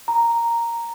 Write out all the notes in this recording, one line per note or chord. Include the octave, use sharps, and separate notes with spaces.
A#5